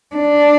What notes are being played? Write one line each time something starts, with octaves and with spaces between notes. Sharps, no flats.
D4